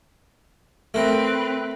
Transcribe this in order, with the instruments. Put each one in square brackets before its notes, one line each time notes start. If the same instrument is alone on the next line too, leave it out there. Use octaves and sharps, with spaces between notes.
[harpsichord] A3 A#4 [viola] C4 B4